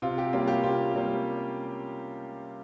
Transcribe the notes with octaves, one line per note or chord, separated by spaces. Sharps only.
C3 F4
G4
G3 A#3 C#4 F4
G4
C3 F4
G3 A#3 C#4